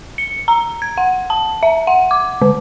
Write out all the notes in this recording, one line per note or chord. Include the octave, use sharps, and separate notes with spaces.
C#7
A#5
G#6
F#5
A5
E5
F#5
D6
D3